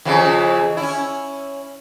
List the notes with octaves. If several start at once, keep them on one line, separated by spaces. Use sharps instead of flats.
F2 C#3 E3
C#4 E4